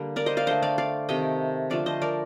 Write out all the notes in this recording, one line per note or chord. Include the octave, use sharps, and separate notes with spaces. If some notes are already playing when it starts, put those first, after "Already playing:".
Already playing: D3 G3 A#3
A#4 D5
C5 D#5
D5 F5
D3 A3 C5 D#5
D5 F5
D5 F5
C3 D#3 A3 D#5 G5
D3 F3 A3 D5 F5
C5 D#5
A#4 D5